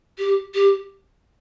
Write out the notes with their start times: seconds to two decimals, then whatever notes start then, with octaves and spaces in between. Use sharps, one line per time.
0.18 G4
0.54 G4